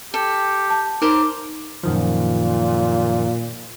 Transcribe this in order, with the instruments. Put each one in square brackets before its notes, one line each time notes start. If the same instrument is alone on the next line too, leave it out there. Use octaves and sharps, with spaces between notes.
[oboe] G4 [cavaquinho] A4
[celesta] A5
[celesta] D#4 [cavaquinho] A#4 C5 [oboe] D6
[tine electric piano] F#2 D#3 F3 [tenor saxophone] A#2